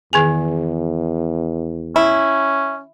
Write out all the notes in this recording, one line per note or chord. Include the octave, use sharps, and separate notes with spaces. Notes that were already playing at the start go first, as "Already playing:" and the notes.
E2 D#3 G#4 G#5
C#4 E4